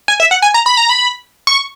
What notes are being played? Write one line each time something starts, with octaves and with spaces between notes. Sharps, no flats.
G#5
E5
F#5
G#5
A#5
B5
A#5
B5
C#6